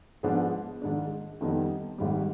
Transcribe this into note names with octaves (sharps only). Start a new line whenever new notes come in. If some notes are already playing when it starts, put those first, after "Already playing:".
G#2 F3 B3 D4 G#4
G#2 D#3 G#3 D4
F2 D#3 G3 B3 D#4
G#1 G#2 D#3 G3